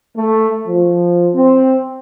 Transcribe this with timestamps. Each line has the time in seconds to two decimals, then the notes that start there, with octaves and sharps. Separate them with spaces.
0.16 A3
0.67 F3
1.34 C4